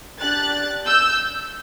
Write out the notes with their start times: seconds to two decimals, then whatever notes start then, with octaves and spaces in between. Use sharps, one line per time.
0.20 D4 G4 F#6 A6
0.86 E6 G6